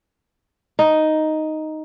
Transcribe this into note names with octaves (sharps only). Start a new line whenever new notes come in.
D#4